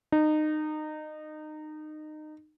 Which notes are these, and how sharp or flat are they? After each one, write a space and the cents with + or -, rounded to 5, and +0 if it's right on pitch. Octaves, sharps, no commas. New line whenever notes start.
D#4 -25